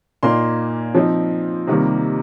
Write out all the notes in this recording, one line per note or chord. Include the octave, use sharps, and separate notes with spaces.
A#2 A#3 D#4 C6
F3 C4 D#4
C3 D#3 G3 A#3